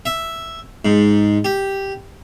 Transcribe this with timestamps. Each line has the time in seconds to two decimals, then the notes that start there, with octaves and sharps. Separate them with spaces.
0.06 E5
0.85 G#2
1.45 G4